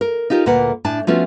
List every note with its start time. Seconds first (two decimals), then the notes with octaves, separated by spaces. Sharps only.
0.01 A#4
0.30 D#4 F4 G4 A4 A#4
0.46 D2 A#2 A#3 A#4 B4 F#5
0.84 A2 D4 G#5 A5
1.07 F3 A3 B3 C#4 F4 F#4